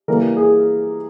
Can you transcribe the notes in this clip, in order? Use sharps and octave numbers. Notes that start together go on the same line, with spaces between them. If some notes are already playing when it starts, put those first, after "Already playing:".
E3 G3 A#3 A#4
G#4